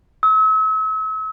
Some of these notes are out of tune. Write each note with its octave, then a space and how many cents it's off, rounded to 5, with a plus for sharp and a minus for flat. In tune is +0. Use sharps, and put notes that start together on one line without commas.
E6 -40